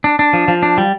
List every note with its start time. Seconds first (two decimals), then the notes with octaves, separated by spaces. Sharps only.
0.04 D4
0.19 D4
0.33 F3
0.48 F3
0.63 D4
0.78 G3